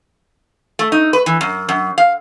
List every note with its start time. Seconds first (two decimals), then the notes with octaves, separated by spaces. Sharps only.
0.79 A3
0.92 D#4
1.13 B4
1.26 E3
1.41 F#2
1.69 F#2
1.98 F5